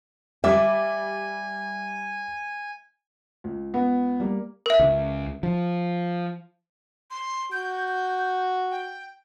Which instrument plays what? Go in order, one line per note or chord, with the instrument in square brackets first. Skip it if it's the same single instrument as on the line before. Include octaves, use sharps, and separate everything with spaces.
[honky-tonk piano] G3 D6 [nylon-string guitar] E5 [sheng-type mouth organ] G#5
[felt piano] C#2
[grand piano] B3
[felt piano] G3 A#3
[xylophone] A#4 E5
[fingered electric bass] C#2
F3
[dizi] C6
[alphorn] F#4 [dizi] G6
[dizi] G5